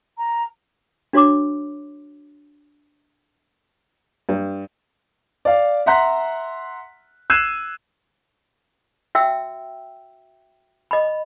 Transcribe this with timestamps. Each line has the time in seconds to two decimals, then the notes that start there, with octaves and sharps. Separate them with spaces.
0.18 A#5
1.13 D4 F#4 C#5 C6 D6
4.29 G2
5.45 D5 F5
5.86 E5 F#5 A#5 C6 F#6 B6
7.30 E6 F#6 G#6 C7 D#7 E7
9.15 F#4 E5 G5 E6
10.91 D#5 B5